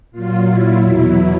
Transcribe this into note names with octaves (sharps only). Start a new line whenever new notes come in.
A#2 F#3 F4
E4
E2 B2 F#3